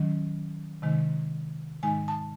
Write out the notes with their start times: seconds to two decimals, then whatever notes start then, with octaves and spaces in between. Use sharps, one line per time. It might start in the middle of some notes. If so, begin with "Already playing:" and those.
Already playing: D#3 F#3 C#4
0.82 C3 D#3 G#3 D#4
1.83 G#2 D#3 G#3 D#4 G#5
2.08 A5